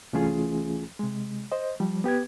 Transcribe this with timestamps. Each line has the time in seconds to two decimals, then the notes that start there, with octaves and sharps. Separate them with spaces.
0.13 C2 E3 A3 C#4 F4 G#4
0.99 C3 G#3
1.52 C5 D#5
1.80 F3 G3
2.04 B3 G4 B4 G#6